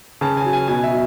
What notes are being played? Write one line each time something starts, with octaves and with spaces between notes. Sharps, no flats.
C#3 A5
G#5
F#3
G#5
B2 G#5
E5
F#3